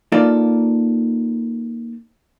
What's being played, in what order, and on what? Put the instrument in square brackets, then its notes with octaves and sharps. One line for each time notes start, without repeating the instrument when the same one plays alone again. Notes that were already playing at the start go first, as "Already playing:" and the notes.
[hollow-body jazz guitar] A#3 D#4 F4 A4 D5